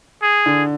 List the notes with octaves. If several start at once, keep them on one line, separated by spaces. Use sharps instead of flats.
G#4
D3